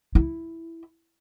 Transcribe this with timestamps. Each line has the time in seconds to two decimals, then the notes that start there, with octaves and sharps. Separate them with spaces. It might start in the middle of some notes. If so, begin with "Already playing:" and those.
0.15 E4